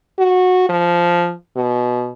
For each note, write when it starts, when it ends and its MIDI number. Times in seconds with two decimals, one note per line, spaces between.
0.19 0.67 66
0.69 1.33 53
1.57 2.12 47